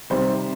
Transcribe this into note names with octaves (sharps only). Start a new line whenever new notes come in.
C3 D#3 G3 C5